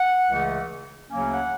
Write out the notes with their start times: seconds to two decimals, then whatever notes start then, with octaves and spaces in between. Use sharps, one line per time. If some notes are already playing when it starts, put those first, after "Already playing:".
Already playing: F#5
0.29 C#2 C#3 E3 A3
1.10 D2 C#3 F#3 A#3 C#4
1.31 F#5